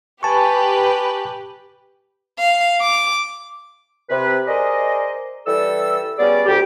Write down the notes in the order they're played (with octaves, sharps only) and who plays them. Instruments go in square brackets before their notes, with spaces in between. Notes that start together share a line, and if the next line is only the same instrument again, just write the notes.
[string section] G4 B4 [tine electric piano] G#5 A5 C#6
[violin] F5
D6
[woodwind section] C3 B4
G#4 A#4 C5 D5 D#5
E3 G3 A4 E6
G3 B3 C#4 F#4 G#4 D5
D2 G4